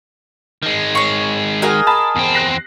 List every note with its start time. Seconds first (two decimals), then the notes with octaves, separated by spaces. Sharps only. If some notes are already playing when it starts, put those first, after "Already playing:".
0.63 D#3 G#3
0.95 C#5 C#6
1.62 F#4 G#4 A#4 D#5
1.87 A5 B5
2.16 E2 C4
2.34 F#6 A#6 C7